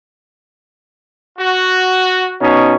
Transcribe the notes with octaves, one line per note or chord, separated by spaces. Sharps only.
F#4
B2 C#4 D#4